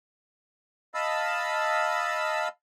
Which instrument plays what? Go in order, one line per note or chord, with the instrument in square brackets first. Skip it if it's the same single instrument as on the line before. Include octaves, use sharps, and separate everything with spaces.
[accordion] D#5 F5 A5 B5 E6